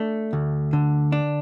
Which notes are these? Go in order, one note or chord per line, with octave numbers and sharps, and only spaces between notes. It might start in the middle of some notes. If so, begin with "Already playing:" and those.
Already playing: A3 D4
D2
D3
D4